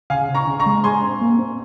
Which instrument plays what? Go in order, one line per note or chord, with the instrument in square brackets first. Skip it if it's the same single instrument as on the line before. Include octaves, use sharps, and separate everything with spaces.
[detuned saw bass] C#3 [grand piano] F5 G#5
[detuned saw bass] C#3
C3
[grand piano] A#5 C#6
[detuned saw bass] C#3
[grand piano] A#5 C#6
[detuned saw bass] G#3
[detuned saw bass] G#3 [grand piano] G#5 C6
[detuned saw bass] C4
A#3
C4